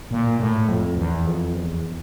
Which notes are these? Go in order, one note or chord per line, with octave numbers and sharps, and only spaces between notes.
A#2
A2
F2
E2
F2
E2